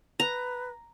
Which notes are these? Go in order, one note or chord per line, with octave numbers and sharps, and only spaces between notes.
B4 A#5